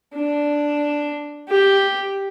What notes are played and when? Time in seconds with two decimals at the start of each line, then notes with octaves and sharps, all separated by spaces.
0.15 D4
1.49 G4